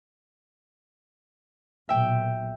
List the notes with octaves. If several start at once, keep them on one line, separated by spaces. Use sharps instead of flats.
B1 A#2 E5 G5